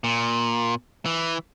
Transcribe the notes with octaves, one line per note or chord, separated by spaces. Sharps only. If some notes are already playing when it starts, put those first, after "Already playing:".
A#2
E3